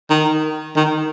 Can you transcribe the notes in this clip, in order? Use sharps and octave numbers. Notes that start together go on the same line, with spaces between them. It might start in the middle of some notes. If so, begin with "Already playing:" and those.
D#3
D#3